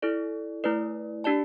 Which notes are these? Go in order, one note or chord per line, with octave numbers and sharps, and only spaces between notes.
E4 A4 D5
A3 E4 B4 D5
D4 G4 D5 A5